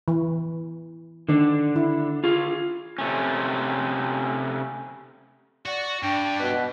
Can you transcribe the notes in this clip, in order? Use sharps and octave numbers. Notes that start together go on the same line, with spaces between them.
E3
D3 D#3 D4
E4
F4 G#4
C3 A3 C#4
F#4 D5
G2 D4 G5
B2 B4